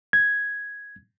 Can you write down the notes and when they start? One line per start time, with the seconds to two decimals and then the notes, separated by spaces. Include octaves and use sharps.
0.13 G#6